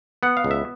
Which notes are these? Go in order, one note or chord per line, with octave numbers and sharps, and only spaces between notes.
B3 F#5
F5
C#2
E5